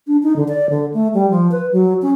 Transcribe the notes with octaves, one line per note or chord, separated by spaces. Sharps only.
D4
D#4
D3
D5
D3
A3
G3
F3
B4
F#3
C#4